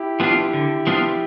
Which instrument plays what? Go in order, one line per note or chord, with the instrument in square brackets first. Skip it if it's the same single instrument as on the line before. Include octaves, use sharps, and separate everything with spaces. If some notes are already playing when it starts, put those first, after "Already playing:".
Already playing: [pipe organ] E4 G4
[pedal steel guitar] F3 B3 D4 F4
D3
F3 B3 D4 F4